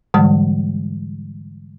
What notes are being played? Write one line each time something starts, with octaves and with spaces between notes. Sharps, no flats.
G#2 D3 E3 G3 G#3